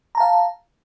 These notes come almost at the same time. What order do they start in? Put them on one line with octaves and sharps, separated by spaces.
A#5 A5 F5